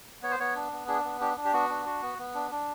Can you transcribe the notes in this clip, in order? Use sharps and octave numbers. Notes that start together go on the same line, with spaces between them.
B3 C#5
C5
B3 C#5
D4
B3
D4 G#4
B3
D4 G4
D4
G4
B3 F#4
D4
F#4
B3
B3
D4
D4